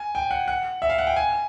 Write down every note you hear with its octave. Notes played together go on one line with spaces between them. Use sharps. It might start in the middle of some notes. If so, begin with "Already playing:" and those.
Already playing: G#5
G5
F#5
F#5
E5
F5
F#5
G5
G#5